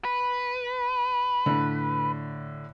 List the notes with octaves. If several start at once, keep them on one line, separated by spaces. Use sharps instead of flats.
B4
A2 D3